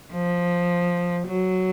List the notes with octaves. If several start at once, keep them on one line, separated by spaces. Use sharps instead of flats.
F3
F#3